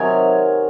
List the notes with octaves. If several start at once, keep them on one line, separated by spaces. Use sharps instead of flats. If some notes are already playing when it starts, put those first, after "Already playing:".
Already playing: C3 D#3 F#3 G#5